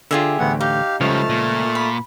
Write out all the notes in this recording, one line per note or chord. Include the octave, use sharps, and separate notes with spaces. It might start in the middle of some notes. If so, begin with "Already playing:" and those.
D3 F4 G4 G#4 E5
A1 D2 B3 F#5
D#4 G4 F5
C#2 C#3 F3 G3 A3 C#5 A5 F6
A#2
B5